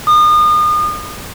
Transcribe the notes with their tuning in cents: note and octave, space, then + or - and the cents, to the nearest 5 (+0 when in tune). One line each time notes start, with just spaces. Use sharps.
D#6 -35